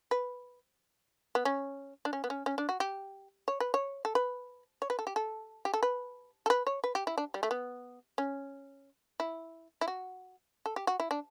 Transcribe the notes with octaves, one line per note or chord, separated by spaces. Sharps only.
B4
B3
C#4
D4
C#4
B3
C#4
C#4
D4
F#4
G4
C#5
B4
C#5
A4
B4
C#5
B4
A4
G4
A4
G4
A4
B4
A4
B4
C#5
B4
G4
E4
D4
G3
A3
B3
C#4
E4
E4
F#4
A4
G4
F#4
E4
D4